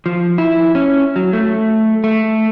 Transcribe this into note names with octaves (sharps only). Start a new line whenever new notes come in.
F3
E4
C#4
F#3
A3
A3